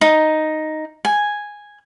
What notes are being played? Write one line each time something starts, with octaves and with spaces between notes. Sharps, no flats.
D#4
G#5